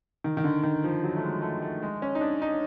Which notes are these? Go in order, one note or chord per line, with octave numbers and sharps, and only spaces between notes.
D#3
D#3
D3
D#3
F3
F#3
A3
G#3
A3
A3
G#3
C#4
D#4
D4
D#4